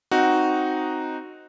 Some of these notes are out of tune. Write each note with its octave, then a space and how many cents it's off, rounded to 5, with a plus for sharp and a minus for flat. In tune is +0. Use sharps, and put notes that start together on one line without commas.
C4 +0 D#4 +0 F#4 +0